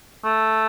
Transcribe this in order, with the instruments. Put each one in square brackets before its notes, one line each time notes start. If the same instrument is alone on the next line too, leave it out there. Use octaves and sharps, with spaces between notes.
[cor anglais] A3